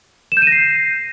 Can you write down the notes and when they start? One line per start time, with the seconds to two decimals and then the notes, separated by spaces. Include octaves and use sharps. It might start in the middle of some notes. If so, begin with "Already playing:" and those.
0.32 E7
0.37 G6
0.42 D#7
0.47 A#6
0.52 C7